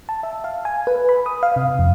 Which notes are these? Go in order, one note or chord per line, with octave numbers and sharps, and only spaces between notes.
A5
E5
F5
G#5
B4
B5
D#6
F5
C3
F2